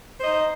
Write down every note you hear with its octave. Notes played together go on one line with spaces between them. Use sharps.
D#4 C5 D#5